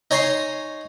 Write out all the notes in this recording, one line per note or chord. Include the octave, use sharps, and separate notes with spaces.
D#4 C#5 G#5 A#5 C6